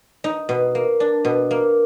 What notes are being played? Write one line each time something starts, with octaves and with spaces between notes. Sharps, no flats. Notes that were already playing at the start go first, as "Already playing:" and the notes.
D#4
B2
A#3
D4
B2
A#3